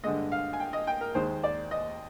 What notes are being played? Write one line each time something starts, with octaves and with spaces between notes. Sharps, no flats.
G2 D3 G#3 D#5
F5
G#5
G5
D#5
G5
A#4
D#2 D#3 G#3 C5
D5
D#5